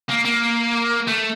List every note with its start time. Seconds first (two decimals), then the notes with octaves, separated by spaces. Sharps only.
0.09 A#3
0.25 A#3
1.08 A3